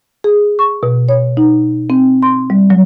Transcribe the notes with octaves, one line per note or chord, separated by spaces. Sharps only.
G#4
C#6
B2
C#5
D#4
C4
C6
G3
F#3